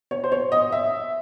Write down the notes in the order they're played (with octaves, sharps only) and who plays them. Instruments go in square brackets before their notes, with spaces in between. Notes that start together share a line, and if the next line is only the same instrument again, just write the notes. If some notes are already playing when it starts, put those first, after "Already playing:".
[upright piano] C#5
C5
C#5
D#5
E5